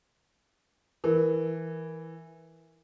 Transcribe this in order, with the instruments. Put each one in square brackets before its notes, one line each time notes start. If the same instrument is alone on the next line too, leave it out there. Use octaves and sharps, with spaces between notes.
[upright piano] E3 [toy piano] A#4